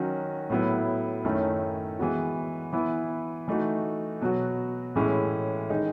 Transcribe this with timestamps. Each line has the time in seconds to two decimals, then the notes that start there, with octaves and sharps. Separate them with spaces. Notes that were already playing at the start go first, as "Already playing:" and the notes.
Already playing: D#3 F#3 C#4 F#4
0.50 A2 F#3 B3 E4
1.25 F#2 D#3 A3 C#4 E4
1.99 E3 G#3 B3 F#4
2.73 E3 B3 E4
3.48 E3 A3 D#4 F#4
4.21 B2 F#3 B3 F#4
4.96 A2 E3 G#3 C#4 E4
5.70 D#3 G#3 D#4